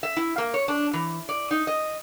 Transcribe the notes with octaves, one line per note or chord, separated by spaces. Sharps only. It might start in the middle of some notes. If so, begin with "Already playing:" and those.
E5
E4
A#3
C#5
D4
E3
D5
D#4
D#5